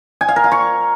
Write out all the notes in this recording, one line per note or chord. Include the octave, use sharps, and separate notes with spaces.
G#5
F5
A#4
F5
C#6